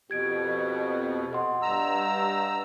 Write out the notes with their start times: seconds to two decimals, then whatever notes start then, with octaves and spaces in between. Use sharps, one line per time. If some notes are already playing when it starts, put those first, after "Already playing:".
0.10 F2 B2 G4 G#6 D7
1.33 D#5 F#5 C6
1.62 G2 A#5 E6